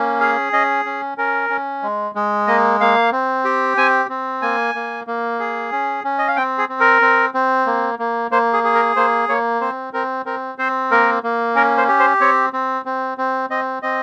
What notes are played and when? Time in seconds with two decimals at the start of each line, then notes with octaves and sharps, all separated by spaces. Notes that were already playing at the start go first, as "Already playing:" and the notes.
Already playing: A#3 C#4
0.20 G#4 F5
0.53 C#4 D#5
0.85 C#4
1.18 C#4 A#4
1.50 C#4
1.83 G#3
2.15 G#3
2.47 A#3 D#5
2.80 A#3 F5
3.12 C4
3.45 G4
3.77 C4 G#5
4.09 C4
4.42 A#3 G#5
4.75 A#3
5.07 A#3
5.40 G#4
5.72 C#4
6.04 C#4
6.18 D#5
6.28 F5
6.36 C4 G5
6.58 G#4
6.69 C4
6.80 A#4
7.02 C4
7.34 C4
7.66 A#3
7.99 A#3
8.31 A#3 C5
8.53 G#4
8.64 G#4
8.75 A#4
8.96 A#3 C5
9.29 A#3 C#5
9.61 C4 C5
9.93 C4 A#4
10.26 C4 A#4
10.58 C4 C5
10.91 A#3 A#4
11.23 A#3
11.55 C#4 A#4
11.77 C5
11.88 G4
11.99 C5
12.20 C4 C#5
12.53 C4
12.86 C4
13.18 C4
13.50 C4 D#5
13.82 C4 D#5